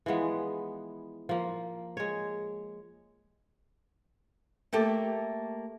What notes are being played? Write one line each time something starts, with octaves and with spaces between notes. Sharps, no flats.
E3 F3 G#3 B3
F3 A#3
G#3 C#5
A3 A#3 G4 A4